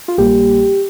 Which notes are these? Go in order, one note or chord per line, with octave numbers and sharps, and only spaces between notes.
F4
A#1 A#2 G3 A#3 G4